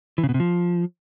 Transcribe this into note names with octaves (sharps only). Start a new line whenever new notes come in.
E3
C#3
B2
C3
F3